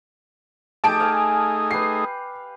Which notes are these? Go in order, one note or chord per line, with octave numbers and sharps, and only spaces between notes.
A3 D#4 G4 G#4 A5 D7
F5 G#5
G4 B4 C7